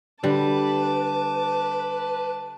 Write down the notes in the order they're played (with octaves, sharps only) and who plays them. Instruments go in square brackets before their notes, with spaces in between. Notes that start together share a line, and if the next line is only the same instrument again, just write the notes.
[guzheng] D3 [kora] G3 [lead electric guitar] B4 [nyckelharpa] A5 D6